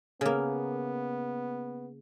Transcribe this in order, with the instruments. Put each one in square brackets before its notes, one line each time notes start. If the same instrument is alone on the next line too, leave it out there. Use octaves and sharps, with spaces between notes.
[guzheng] C#3 A#3 [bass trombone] B3